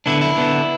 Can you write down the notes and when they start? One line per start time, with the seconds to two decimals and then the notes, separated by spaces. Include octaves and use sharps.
0.06 D3 B3 D4 E4
0.21 E4
0.36 D3 B3 D4